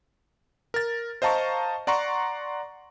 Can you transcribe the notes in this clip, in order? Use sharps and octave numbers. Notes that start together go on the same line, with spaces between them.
A#4 A6
C5 D#5 F5 A5 A#5 C#6
D5 F#5 A#5 C6 C#6